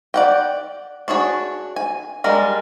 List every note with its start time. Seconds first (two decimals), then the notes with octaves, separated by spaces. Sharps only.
0.14 D5 F#5 G5
1.08 D4 F#4 G#4 C#5
1.76 G#5
2.24 G3 G#3 D4 A#4